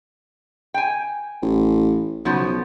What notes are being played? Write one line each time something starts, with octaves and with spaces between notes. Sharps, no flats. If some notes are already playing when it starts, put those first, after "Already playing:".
G5 G#5
A1
B1 C#3 F3 B3